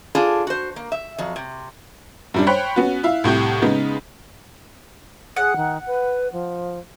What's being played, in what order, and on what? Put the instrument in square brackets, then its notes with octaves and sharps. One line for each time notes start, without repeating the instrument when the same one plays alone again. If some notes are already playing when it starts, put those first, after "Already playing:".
[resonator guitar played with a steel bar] D4 F4 G#4 A4
F#4 C5
A#3
E5
F2 F#3
C3
[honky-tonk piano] F#2 G3 D4
C5 C#5 G5 B5 F#6 B6
B3 C#4 F#4
E4 E5 F5
C2 A2 G4 G6
C#3 G#3 B3 D#4
[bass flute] G#4 [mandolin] F#5
[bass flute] D#3
B4
F3